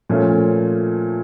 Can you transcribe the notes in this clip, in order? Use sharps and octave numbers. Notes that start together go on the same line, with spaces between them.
A#2 F3 A3 C#4 F4